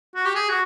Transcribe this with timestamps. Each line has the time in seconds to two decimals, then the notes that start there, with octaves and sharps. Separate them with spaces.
0.15 F#4
0.25 G4
0.35 G#4
0.49 F#4